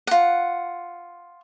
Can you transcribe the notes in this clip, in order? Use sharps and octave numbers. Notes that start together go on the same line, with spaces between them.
F4 F#5